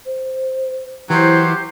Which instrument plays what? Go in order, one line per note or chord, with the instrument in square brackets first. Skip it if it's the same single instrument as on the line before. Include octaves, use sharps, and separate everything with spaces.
[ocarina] C5
[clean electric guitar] E3 [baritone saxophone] F#3 [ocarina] E4 [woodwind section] G4 C5